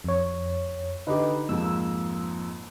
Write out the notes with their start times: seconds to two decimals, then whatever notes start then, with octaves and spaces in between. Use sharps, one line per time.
0.04 F2 C#5
1.07 D3 D4 D#4 G4 B4 D#5
1.49 F2 G#2 A#3 E6